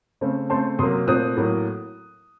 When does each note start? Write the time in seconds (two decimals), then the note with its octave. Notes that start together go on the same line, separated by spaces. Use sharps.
0.21 C#3 A3 C4
0.50 C#3 A3 C4 A5 C6
0.79 C3 F#3 A#3 C6 D#6
1.07 A#2 A3 C4 D#6 F#6
1.37 A2 F#3 A#3